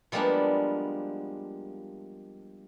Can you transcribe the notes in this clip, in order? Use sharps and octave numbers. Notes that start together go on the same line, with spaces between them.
F3 G3 G#3 A#3 B3 D4